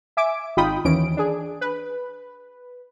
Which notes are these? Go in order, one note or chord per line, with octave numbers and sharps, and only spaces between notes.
E5 G#5 D6 D7
G#1 D#4 F4 G5 B5 D#6
D#2 E3 C#4 D7
D4 G#4
B4